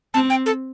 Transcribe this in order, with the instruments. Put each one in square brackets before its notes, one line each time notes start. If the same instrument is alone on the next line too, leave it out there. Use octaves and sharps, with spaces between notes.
[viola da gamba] C4 [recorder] A5
[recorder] G5
A4